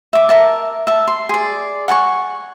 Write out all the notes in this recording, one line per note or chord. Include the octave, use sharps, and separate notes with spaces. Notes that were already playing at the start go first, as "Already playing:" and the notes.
E5 D6
A#4 E5 A5
E5 A5
C6
G#4 D5
F#5 G#5 A5 C#6